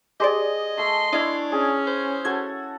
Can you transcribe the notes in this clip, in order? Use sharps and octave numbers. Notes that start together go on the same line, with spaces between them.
G#3 G4 G#4 C5 D5 D#5
A3 C6
D4 E4 C#5 D#5 F5
C#4 G#4
C5
F#4 A4 G#6